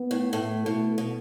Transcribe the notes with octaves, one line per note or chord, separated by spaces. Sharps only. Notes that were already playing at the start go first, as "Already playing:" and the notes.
Already playing: B3
A2
A2 A3
B2 A3
B2